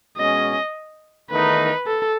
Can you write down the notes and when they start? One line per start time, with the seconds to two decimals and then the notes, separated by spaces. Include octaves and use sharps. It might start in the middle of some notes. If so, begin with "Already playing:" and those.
0.18 B2 G#3 C#4 D#5
1.30 E2 D#3 A3 D#4 B4
1.87 A4